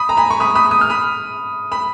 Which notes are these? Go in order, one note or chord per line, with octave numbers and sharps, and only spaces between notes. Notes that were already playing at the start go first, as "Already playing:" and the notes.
Already playing: B5 D#6
A#5
G#5 B5
C#6
B5 D#6
B5 D#6
D#6
F6
B5 D#6
B5